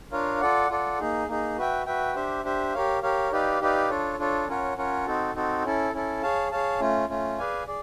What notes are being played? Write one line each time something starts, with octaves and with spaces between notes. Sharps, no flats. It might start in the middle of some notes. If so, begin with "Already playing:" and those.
D4 F4 A#4 C#5 F5
F4 A4 D5 F#5
F4 A4 D5 F#5
A#3 D#4 G#4
A#3 D#4 G#4
F#4 B4 E5 G5
F#4 B4 E5 G5
D4 G4 C5 E5
D4 G4 C5 E5
G4 A#4 C#5 F5
G4 A#4 C#5 F5
D#4 G4 B4 D5 F5
D#4 G4 B4 D5 F5
D4 F4 A4 C#5
D4 F4 A4 C#5
C#4 F4 A#4 C#5 F#5
C#4 F4 A#4 C#5 F#5
C4 D#4 F#4 A4
C4 D#4 F#4 A4
C#4 E4 A4
C#4 E4 A4
G#4 C#5 F5 A5
G#4 C#5 F5 A5
A3 C#4 F4
A3 C#4 F4
G#4 B4 D5 F5 G#5
G#4 D5